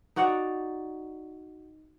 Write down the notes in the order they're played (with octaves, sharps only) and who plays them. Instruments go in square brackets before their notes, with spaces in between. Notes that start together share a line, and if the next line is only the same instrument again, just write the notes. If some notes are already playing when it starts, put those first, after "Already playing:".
[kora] D#4 F#4 D5 F#5